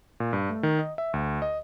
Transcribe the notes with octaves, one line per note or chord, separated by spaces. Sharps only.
A#2
G2
A3
D#3
D#5
E5
D2
D#5